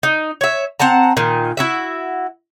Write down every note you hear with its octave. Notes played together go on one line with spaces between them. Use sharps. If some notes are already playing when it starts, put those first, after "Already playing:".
D#4
C#5 E5
C4 F#5 A5 A#5
A#2 D#3
E4 F#4 E5